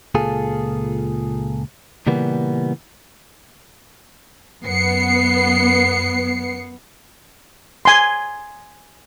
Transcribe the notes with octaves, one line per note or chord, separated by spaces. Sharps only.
C#2 A#2 F4 G#4 A4
A#2 C#3 E3 G3 A#3 B3
F#2 B3 C7 C#7
G#5 C6